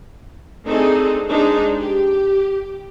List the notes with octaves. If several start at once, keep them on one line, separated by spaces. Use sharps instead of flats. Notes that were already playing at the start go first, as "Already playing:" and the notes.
A3 C4 D4 D#4 G#4 A4
G#3 D4 D#4 C5
G4